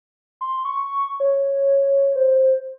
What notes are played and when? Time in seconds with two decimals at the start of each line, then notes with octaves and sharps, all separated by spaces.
0.41 C6
0.65 C#6
1.20 C#5
2.16 C5